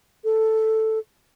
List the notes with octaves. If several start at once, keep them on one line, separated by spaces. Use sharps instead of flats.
A4